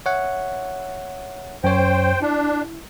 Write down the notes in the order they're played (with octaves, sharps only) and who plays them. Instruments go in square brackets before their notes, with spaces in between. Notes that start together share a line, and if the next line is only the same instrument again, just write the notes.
[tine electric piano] C#5 E5 F#5
[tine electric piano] F#2 C#5 [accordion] C5 G5
[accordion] D4 [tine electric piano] E4